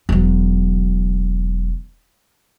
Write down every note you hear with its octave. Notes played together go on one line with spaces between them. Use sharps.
E1 F#3